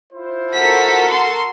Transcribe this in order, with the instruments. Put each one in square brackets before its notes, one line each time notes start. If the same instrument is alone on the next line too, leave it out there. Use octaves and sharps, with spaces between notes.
[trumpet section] E4 F4 C5
[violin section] F#4 A4 A#4 [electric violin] B6
[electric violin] C6